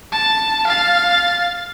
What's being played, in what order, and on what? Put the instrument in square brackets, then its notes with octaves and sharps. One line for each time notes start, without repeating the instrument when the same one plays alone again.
[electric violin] A5
F5 A6